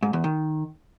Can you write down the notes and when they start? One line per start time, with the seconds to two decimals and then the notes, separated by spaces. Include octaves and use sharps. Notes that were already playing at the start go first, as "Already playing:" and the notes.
0.03 G#2
0.13 E2
0.24 D#3